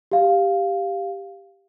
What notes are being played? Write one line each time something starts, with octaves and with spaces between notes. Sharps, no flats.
G4 F5